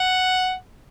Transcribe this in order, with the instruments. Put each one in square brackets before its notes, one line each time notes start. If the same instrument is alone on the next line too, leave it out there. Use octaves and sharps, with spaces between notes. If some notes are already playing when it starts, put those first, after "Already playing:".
Already playing: [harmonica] F#5